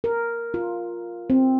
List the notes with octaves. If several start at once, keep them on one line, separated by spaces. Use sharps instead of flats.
A#4
F4
C4